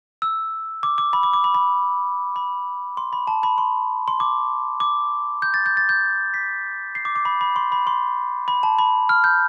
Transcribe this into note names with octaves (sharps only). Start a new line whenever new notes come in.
E6
D6
D6
B5
D6
D6
B5
B5
B5
C6
B5
A5
B5
C6
C6
D6
D6
G6
A6
G6
A6
G6
B6
C7
D6
D6
B5
B5
C6
B5
C6
B5
A5
B5
F6
G6